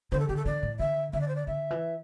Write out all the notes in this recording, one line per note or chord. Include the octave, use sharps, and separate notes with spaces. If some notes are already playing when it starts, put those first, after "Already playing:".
D3 C5
A4
D3 G4
A4
D3 D5
A2
D3 E5
D3 E5
D5
C5
D5
D3 E5
E3